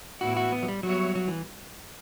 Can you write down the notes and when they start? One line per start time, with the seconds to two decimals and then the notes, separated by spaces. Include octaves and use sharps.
0.21 A2 E3 B3 E4 F#4
0.37 F#4
0.52 B3
0.63 F#3
0.68 G3
0.83 F#3 G3 B3 F#4 C#5 E5
1.15 F#3
1.28 E3